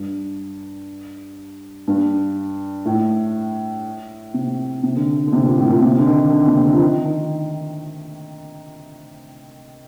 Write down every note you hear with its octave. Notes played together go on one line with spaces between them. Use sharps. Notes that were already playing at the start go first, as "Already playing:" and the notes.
Already playing: G2
G2
A2
C3
C3
D3
D3
C3
A#2
A2
A#2
C3
D3
D#3
D3
C3
D3
F3
D#3
D#3